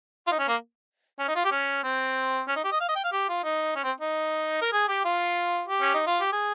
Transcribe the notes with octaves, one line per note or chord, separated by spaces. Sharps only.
F4
D#4
C#4
A#3
C#4
D#4
F4
G4
C#4
C4
C#4
D#4
G4
D#5
F5
D#5
G5
F5
G4
F4
D#4
C#4
C4
D#4
A#4
G#4
G4
F4
G4
C#4
D#4
F4
G4
G#4